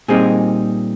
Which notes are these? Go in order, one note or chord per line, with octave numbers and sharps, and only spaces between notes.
A#2 G3 C4 D#4 G#4